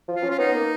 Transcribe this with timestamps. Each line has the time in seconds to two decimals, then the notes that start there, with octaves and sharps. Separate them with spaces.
0.08 F3
0.16 F4
0.23 C#4
0.31 F4
0.39 B3 D#4
0.54 A#3